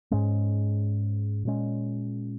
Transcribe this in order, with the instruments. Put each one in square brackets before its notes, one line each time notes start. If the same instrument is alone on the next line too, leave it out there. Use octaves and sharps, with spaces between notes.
[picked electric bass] G#2 G#3 C#4
A#2 G#3 C#4